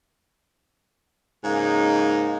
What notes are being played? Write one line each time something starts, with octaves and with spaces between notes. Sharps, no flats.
G#2 C#3 A#3 D#4